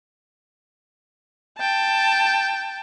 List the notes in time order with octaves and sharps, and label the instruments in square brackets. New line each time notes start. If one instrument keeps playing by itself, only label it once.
[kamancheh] G5 A5